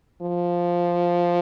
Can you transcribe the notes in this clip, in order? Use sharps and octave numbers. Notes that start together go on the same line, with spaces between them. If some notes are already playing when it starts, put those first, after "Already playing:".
F3